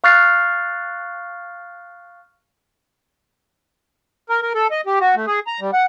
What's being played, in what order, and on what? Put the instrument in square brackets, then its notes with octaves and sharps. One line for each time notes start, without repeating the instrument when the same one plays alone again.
[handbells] F5 C#6 F6 F#6 A6 C7
[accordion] A#4
A#4
A4
D#5
G4
F#4
A3
G#4
A#5
G3
F#5